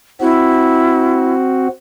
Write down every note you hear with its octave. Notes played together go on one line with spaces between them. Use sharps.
C4 E4 F#4